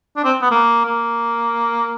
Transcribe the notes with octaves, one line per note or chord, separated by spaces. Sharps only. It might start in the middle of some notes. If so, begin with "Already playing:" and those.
D4
C4
B3
A#3
A#3